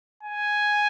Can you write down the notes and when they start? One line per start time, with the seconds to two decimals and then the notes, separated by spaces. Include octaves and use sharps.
0.23 G#5